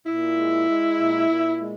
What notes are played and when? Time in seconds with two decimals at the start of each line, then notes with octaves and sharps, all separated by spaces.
0.06 A#2 E4
0.37 G#3
0.68 G#3
1.00 A#2
1.30 A#2
1.62 G#3